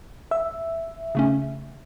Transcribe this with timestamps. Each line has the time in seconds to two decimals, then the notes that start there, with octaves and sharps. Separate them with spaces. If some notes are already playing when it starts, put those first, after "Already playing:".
0.31 E5
1.15 C#3 A3 C#4